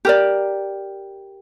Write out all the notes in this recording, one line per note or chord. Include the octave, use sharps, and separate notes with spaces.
G4 A#4 D5